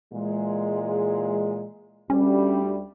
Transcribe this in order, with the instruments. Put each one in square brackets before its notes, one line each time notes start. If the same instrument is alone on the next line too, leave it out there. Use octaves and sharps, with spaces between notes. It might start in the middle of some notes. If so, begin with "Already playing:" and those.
[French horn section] A#2 E3 G#3
[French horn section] D2 G3 [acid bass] C#4